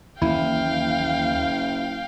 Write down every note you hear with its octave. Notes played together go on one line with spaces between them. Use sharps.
F#1 D#2 E3 E4 F5 G5